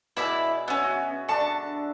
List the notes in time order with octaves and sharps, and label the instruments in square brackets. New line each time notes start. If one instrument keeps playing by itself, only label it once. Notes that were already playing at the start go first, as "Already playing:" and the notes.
[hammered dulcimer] B2 G#4 [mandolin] E4 D5 E5
[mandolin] B3 C#4 [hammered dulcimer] E5
[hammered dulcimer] F#4
[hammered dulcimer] D3 D4 [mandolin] A5 C#6